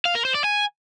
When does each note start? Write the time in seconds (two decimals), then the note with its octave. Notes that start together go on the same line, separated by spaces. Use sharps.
0.05 F5
0.15 A#4
0.25 C5
0.35 D5
0.44 G#5